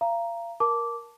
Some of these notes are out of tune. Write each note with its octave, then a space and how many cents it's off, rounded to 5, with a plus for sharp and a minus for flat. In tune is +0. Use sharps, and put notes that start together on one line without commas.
F5 -35 A#5 +0
A#4 +10 A5 +0 D6 -10